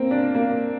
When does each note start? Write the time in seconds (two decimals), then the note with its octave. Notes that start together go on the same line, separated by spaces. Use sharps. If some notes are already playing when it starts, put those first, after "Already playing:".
Already playing: A#3 C4
0.11 D4
0.35 A#3